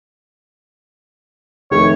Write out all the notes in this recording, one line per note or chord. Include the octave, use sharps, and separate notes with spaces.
F1 D#3 A3 C#5